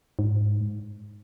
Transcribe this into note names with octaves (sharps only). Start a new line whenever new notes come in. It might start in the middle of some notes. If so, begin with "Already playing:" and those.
G#2